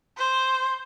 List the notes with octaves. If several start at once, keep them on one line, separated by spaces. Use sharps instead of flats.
C5